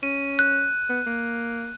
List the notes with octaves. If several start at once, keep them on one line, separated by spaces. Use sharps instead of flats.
C#4 D#7
F#6
B3
A#3